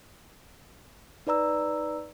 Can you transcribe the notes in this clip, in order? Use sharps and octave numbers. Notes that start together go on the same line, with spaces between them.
D#4 B4 D5 A#5 E6